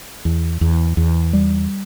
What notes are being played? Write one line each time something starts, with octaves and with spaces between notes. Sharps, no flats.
E2
E2
E2
G3